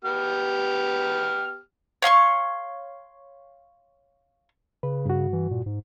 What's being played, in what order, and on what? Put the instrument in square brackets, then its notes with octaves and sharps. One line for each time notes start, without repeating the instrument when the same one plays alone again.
[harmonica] B3 G4 F6
[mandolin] C#5 F5 C6 C#6
[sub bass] C#3 [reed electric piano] B4
[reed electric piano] G2 F#4
[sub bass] E3
A#2
G#2